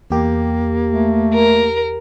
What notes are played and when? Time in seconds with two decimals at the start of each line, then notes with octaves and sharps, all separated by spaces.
0.10 E2 A#3 G4
0.90 A3
1.34 A#4